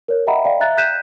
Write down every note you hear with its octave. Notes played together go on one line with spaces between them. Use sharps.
A#4 C#5
D#5 E5 F#5 G5 A#5 B5
D5 F5 G5
E5 A#5 F#6 A6
F#6 G6 B6 D#7 E7